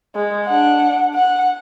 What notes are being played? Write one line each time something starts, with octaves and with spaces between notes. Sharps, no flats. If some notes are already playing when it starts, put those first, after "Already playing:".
G#3
D4 F#5
F#5